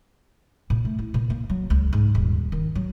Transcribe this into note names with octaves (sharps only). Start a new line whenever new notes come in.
A#2
A3
E4
A#2
A#3
F#3
C#2
G#2
D#1
D#3
F#3